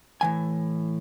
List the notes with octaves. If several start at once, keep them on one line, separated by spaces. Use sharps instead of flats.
A2 E3 G#5